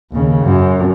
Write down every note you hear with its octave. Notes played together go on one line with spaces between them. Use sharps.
D#2 C#3
F#2